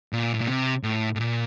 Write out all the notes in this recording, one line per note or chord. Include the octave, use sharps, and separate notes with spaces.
A#2
A2
A#2
C3
A2
A2
A#2